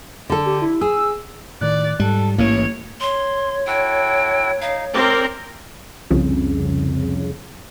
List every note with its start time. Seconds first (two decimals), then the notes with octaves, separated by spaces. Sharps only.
0.30 D3 A4
0.46 G4
0.62 E4
0.81 G#4 E6
1.61 A2 D#3 D5 F#6
2.00 G#2 G3 A4
2.38 A1 E3 A#3 C#5
3.01 C#5 C6
3.67 E4 F#4 A4 G5
4.61 D#4 F5
4.94 C4 A#4 D5 D6
6.10 C2 F2 C#3